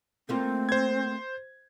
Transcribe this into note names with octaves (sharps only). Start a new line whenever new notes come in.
A3 A#3 C4 F4
C5 G#6